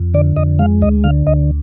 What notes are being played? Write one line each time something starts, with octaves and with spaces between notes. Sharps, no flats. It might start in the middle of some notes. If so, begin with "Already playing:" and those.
Already playing: F2
D3 D5
F2 D#5
G#3 F5
D2 D#5
D3 F5
D2 D#5